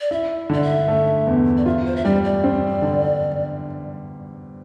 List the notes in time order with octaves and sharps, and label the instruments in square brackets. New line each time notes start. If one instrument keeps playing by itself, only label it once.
[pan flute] D5
[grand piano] E4 [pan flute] E5
[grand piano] D3 [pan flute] D5
[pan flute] E5
[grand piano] A3
E2
[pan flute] D5
[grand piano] F4 [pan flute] E5
[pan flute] C5
E5
[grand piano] G3 [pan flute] D5
[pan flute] D5
[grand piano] C4
D3